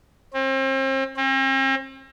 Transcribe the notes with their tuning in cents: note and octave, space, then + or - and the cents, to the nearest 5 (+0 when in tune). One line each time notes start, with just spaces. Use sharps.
C4 +40
C4 +45